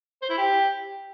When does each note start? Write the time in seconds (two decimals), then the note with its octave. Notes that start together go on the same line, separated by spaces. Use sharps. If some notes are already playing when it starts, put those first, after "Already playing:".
0.22 C5
0.30 E4
0.38 G4